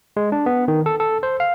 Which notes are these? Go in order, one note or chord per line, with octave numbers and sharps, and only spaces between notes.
G#3
D4
B3
D#3
A4
A4
C5
F5